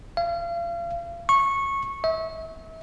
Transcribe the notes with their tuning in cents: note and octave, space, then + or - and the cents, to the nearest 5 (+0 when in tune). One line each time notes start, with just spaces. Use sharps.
F5 -35
C#6 -15
E5 -35